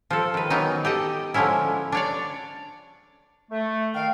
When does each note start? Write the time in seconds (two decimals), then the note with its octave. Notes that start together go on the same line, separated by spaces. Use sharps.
0.10 F3 A4
0.34 D#3 B4
0.50 D#3 E3 F#3 B3 D#4
0.85 G4 A4 D#5
1.34 D3 F3 G#3 C#4 E4
1.92 D4 C#5 D5
3.51 A3
3.95 D#3 F5 G5